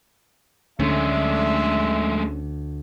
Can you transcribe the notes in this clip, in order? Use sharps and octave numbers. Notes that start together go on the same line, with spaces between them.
D2 D3 G#3 A3 C#4 D4 E5